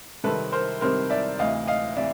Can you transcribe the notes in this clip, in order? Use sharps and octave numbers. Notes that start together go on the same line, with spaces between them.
C3 D#3 G3 C4 A4 B4
A#4 C5
C3 D#3 G3 C4 A#4 C5
D5 E5
D2 C3 E3 D#5 F5
D#5 F5
C3 E3 D5 E5